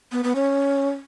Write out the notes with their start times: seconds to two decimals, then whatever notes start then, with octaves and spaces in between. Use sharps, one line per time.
0.12 B3
0.24 B3
0.35 C#4